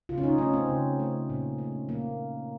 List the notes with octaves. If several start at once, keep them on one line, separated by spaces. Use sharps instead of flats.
C#3 F4
C#4
D#4
A3 C#4
C4
C#3
A3
A#2
A3
A#2 A#3